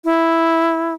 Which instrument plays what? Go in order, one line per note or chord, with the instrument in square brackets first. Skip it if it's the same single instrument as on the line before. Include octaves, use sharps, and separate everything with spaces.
[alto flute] E4